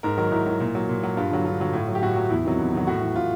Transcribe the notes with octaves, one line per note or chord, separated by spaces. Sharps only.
G#2 A#4
D#3 F#3 A#4
G#2 E4
D#3 F#3
A#2
F#3
A#2
F#3
G2 F4
D3 F#3
G2 F4
D3 F#3
A2
F#3
G4
A2 F#4
F#3
E2 E4
C3 D#3 F#3
E2
C3 D#3 F#3
A2 F#4
E3
A2 F4